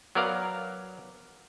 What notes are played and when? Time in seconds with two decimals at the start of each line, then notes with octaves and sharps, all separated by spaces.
0.15 F#3 B3 A#4 D5 F5 A#5